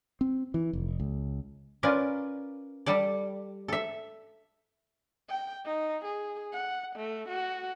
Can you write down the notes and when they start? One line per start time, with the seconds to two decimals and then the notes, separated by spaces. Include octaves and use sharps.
0.21 C4
0.54 E3
0.73 F1
1.00 C#2
1.83 C#4 F4 A#4 B4 D5
2.86 G3 A4 D5
3.68 A4 E5
5.29 G5
5.65 D#4
6.04 G#4
6.53 F#5
6.95 A3
7.28 F#4